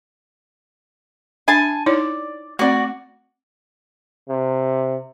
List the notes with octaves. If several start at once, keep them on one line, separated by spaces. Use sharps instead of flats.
D4 E5 G#5 A5 B5
D#4 E4 C#5 D5
A3 C4 F#4 D5
C3